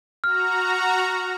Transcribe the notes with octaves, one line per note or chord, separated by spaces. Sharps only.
F#4 A#5 F6